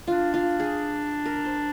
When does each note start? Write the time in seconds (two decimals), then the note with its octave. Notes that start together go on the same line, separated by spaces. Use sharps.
0.07 D4 F4
0.34 F4
0.60 G#4
1.26 A#4
1.45 C5